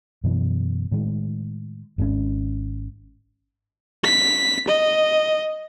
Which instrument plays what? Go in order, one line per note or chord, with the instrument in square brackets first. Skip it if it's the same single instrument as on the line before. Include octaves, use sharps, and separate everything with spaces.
[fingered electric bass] F#2 B2 E3
A2 D#3 G#3
G#1 G#2 C#3 C#4
[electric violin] B6
D#5